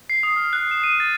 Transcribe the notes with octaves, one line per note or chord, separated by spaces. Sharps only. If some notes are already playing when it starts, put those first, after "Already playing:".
C7
D#6
F6
F#6
E7
D#7
A6